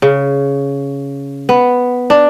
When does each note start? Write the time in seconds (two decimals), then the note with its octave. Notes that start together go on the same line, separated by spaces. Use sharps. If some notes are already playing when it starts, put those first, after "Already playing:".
0.02 C#3
1.49 B3
2.10 D4